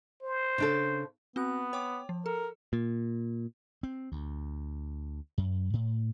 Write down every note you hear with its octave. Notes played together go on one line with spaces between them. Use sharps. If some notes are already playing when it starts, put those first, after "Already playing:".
C5
C#3 D4 A4
B3 C4 F#4 F#6
C#5 G5 D6
F3
A4 A#4
A#2
C4
D2
F#2
A2